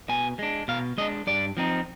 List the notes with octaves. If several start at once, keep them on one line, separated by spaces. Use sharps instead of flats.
B2 G#5
G#3 D4
B2 F5
G#3 D4 D#5
G2 D5
F3 C4 D#4